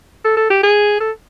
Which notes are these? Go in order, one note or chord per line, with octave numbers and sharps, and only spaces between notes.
A4
A4
G4
G#4
A4